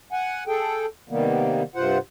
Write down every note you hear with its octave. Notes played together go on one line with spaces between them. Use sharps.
F#5 G#5
G#4 A4 G5
C3 D#3 G3 A#3 B3
G2 C3 F4 C5 F#5